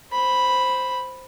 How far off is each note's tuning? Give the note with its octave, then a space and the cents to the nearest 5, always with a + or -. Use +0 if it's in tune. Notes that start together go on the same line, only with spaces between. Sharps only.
C5 +0 B5 +0